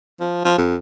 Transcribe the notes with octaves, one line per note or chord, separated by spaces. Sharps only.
F3
F3
F2